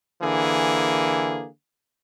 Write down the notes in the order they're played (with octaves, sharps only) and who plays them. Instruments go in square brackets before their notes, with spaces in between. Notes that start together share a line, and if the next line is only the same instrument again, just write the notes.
[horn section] D3 E3 A#3 G#4